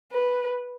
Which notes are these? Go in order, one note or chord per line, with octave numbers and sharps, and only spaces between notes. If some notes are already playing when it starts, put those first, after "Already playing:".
B4